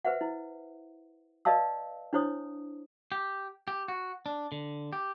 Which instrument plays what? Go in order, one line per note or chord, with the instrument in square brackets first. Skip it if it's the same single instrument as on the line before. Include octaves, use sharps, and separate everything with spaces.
[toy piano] B4 C5 E5 F#5
E4
B4 D5 D#5 F5 A5 E6
D4 E4 C5 C#5 D#6
[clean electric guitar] G4
G4
F#4
D4
D3
G4